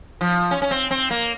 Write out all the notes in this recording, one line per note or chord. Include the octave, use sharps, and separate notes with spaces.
F3
C#4
C#4
C4
C4
A#3